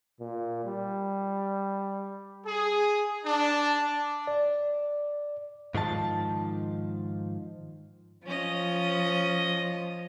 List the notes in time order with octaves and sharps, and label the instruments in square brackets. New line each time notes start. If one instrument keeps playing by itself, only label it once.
[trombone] A#2
G3
[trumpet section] G#4
D4
[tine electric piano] D5
[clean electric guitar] G#2 D#3 F3 A5
[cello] F3 [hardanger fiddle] C#4 D#5